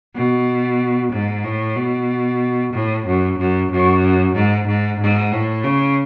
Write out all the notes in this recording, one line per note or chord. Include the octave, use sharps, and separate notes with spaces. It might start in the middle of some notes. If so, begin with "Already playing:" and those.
B2
G#2
A2
B2
A2
F#2
F#2
F#2
G#2
G#2
G#2
A2
C#3